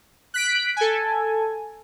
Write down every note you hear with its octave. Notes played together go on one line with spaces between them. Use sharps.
F#6 B6 D7
A4 G#5